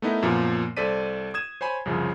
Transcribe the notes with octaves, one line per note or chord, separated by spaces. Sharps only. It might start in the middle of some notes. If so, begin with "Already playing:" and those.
A3 B3 D#4 E4 A#4
F#2 A#2 F3 A#3 B3
C2 A4 C5 D5 B6 D#7
D#6 G#6 E7
C5 C#5 G#5 B5
C2 F#2 C#3 F3